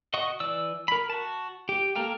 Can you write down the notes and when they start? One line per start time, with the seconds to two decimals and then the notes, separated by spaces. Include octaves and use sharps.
0.14 F#4 D#5 F#5 C#6 D#6
0.40 E3 D5 E6
0.88 A#4 B5
1.10 F#4 A5
1.69 G4 G5
1.95 A#3 A4 A#4 F5 G5